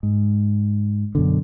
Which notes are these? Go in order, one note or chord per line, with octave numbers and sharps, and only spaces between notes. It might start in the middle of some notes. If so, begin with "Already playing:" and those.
G#2
F#2 B2 D3